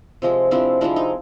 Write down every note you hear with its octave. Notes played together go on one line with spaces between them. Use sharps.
C3 F3 G#3 C4
C3 F3 G#3 C4 D4 E4
C3 F3 G#3 C4 D4 E4
D#4